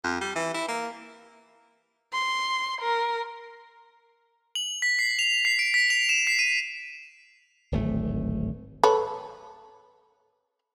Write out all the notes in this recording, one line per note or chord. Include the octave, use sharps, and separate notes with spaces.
F2
G3
E3
E4
A#3
C6
A#4
F#7
B6
C7
F7
C7
D7
B6
F7
E7
C7
D#7
D1 G#1 A3
A4 B4 C#5